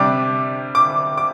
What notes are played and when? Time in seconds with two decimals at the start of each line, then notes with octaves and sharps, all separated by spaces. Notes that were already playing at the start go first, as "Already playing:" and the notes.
Already playing: C3 G3 D4 D6
0.75 D6
1.17 D6